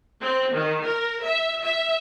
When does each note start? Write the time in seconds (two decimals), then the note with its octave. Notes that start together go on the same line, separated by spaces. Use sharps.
0.21 C4
0.54 D#3
0.85 A#4
1.24 E5
1.63 E5